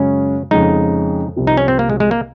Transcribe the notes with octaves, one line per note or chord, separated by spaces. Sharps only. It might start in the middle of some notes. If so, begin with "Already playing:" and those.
Already playing: F#2 C#3 G#3 C#4
F2 C#3 G#3 D#4
C2 C3 F3
D#4
C#4
C4
A#3
G#3
G#3
A#3